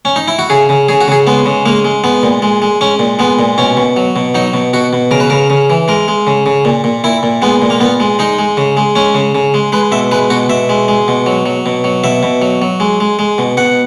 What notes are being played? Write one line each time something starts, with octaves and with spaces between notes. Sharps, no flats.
C#4
D#4
E4
F#4
C#3 G#4
C#3
C#3 G#4
F#4
C#3 G#4
G#3 B3
C#3
G#3 A#3
G#3
G#3 B3
A#2
G#3
G#3
G#3 C#4
A#2
G#3 B3
A#2
B2 C#4
B2
F#3
B2
F#3 D#4
B2
B2 F#4
B2
C#3 A#4
B4
C#3 A#4
C#3
E3
G#3 A#4
G#3
C#3
C#3
A#2
A#2
A#2 E4
A#2
G#3 B3
A#2
A#3
A#2 B3
G#3
G#3 D#4
G#3
C#3
G#3
G#3 C#4
C#3
C#3
G#3
G#3 B4
B2 E5
G#3 B4
B2 F#4
B2 E5
G#3
G#3
B2
F#3
F#3
B2
F#3
B2 E5
B2
F#3
F#3
G#3
G#3
G#3
B2
B2 F#5